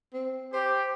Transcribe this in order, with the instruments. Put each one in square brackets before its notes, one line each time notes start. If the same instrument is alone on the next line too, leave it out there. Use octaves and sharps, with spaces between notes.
[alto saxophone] C4
[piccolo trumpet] G4 [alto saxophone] C5